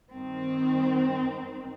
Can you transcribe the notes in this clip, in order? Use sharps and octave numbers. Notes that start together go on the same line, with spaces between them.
G2 D#3 C4